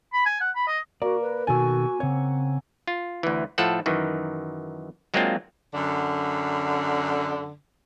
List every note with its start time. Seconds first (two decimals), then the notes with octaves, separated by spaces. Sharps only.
0.13 B5
0.26 G#5
0.40 F#5
0.55 B5
0.67 D#5
1.02 A#3 F#4 A#4 D5
1.21 B4
1.47 B2 D#3 F#4 A4 G#5 E6
2.00 C#3 C4 C#5 F#5
2.87 F4
3.23 D2 E3
3.58 A2 F3 A3 A4 F#5
3.86 F#2 D#3 E3
5.14 F#3 G#3 A#3 C4 D4 F4
5.73 F#2 D3